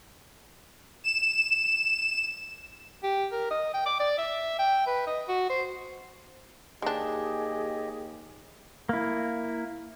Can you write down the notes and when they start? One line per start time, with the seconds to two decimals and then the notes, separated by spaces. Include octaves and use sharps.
1.04 E7
3.03 G4
3.32 A#4
3.51 D#5
3.74 G5
3.86 D6
4.00 D5
4.18 E5
4.59 G5
4.87 B4
5.07 D#5
5.28 F#4
5.50 C5
6.82 D#2 G#3 D4 G4 G#4 D#5
8.89 A#3 E4